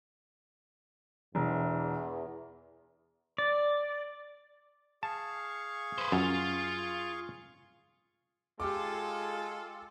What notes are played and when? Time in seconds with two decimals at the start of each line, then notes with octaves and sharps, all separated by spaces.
1.35 E1 E2
3.38 D5
5.03 G#4 F5 A5 C#6
5.98 B4 C5
6.12 F#2 F4
8.60 G#3 F4 G4 A4 D6